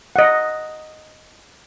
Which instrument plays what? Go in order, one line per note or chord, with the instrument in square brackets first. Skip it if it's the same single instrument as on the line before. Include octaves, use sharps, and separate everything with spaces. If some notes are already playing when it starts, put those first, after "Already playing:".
[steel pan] D#5 F#5